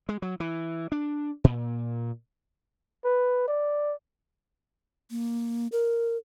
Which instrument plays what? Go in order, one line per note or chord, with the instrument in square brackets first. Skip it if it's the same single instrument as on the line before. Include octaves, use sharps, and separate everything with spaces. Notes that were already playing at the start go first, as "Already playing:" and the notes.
[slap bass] G#3
F#3
E3
D4
A#2
[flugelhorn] B4
D5
[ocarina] A#3
A#4